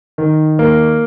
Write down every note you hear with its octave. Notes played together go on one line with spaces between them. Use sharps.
D#3
A#3